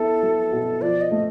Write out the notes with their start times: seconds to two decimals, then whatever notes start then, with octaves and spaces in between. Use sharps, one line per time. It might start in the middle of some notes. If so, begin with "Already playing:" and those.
Already playing: B3 E4 A4
0.23 F#3
0.52 B2
0.81 F3 D5
1.01 D#5
1.11 A3